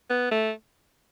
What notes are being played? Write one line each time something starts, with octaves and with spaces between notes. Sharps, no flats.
B3
A3